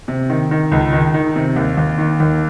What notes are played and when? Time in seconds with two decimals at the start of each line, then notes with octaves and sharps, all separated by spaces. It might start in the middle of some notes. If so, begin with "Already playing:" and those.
0.08 C3
0.30 D#3
0.51 D#3
0.71 C#2
0.93 D#3
1.14 D#3
1.36 C3
1.56 D#2
1.77 D#2
1.98 D#3
2.20 D#2